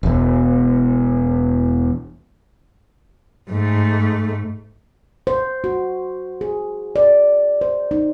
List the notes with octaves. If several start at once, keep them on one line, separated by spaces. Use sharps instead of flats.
E1 E2
G#2 A3
C5
F#4
G#4
D5
C5
D#4